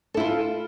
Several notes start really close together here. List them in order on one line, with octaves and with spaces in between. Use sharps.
A4 E4 F4